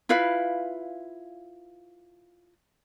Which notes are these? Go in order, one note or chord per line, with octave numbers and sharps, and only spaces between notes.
E4 F4 B4 F5